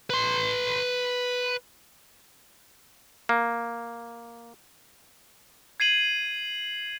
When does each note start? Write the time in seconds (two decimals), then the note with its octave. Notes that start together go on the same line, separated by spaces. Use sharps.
0.10 B4 C6
3.29 A#3
5.80 G#6 C7 D#7 F#7